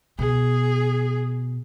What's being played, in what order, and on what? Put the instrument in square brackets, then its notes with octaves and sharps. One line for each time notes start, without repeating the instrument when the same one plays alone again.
[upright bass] B2 [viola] G#4